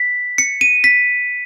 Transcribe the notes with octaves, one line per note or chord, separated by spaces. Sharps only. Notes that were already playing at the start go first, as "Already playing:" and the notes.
Already playing: B6
C#7
D#7
B6